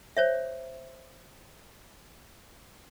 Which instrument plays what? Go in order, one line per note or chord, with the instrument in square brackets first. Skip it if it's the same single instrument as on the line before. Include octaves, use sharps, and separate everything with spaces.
[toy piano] C5 C#5 E5